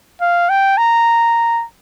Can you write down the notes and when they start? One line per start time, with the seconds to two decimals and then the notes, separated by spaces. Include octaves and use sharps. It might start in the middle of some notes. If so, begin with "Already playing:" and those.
0.21 F5
0.49 G5
0.77 A#5